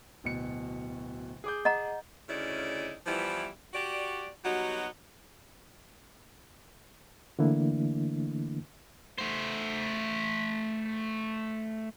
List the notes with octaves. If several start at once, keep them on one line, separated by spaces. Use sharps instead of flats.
D1 B2 C#7
G#4 D6 G6
D#5 F#5 A#5
D2 C#3 C#4 D#4 E4 D5
E3 F3 G3 B3 E4
F#4 G4 D5
F#3 G3 B3 D#4 F#4
D3 E3 A3 A#3 D4 E4
A3 C5